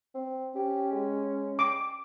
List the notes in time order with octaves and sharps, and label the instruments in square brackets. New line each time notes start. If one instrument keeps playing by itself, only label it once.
[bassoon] C4
[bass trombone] C#4 [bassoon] G4
[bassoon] G#3
[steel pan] D6